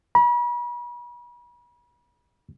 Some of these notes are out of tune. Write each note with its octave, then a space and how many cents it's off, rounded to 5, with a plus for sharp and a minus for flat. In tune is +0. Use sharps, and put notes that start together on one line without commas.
B5 -40